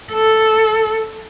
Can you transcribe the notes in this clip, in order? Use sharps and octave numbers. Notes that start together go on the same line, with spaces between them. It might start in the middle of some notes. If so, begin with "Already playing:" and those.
A4